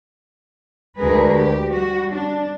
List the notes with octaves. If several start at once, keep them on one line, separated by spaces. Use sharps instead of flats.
D2 D3 G#3 G#4 A#4 B4
G4
G3 F#4
D4